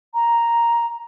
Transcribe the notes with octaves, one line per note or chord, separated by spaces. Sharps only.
A#5